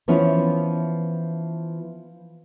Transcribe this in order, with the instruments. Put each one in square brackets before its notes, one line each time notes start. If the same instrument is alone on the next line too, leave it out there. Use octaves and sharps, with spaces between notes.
[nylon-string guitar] E3 F3 B3 C#4 E4